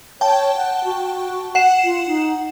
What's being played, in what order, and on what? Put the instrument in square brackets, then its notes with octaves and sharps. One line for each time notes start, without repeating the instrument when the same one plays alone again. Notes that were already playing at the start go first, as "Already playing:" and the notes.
[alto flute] C#5 [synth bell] G5 A5
[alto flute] F#5
F#4
[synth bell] F#5 C7 E7
[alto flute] F4
D#4